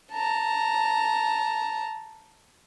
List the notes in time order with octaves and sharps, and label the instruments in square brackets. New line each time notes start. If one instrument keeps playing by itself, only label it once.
[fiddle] A5 A#5